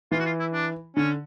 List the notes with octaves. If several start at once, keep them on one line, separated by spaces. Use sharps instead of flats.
E3 F4
F#4
F4
E4
D4
D3 C#4